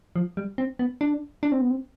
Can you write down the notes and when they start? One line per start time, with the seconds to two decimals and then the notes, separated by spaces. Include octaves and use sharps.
0.16 F3
0.37 G3
0.58 C4
0.79 B3
1.01 D4
1.43 D4
1.52 C4
1.61 B3
1.71 C4